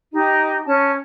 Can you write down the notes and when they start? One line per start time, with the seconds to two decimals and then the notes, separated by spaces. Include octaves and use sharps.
0.12 D#4 G4 D#5
0.66 C#4 A5